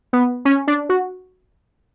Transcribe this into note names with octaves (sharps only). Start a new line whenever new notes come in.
B3
C#4
D4
F#4